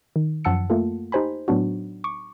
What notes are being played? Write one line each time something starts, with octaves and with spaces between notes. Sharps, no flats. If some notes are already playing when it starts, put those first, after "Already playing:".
D#3
F#2 F3 F#5 A5 E6 C#7
A3 A#3 F4 A4
D#4 G4 C5 G#5 B5
A2 F#3 B3 D4 F#4
C#6 D6